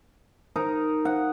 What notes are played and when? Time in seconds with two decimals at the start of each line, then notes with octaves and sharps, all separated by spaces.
0.56 D#4 A#4 A#5
1.05 F#5